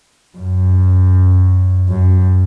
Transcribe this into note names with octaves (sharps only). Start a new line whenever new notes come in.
F#2
F#2